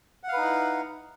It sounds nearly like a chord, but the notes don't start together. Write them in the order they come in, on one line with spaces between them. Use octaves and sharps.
F#5 F5 B4 D#4 E4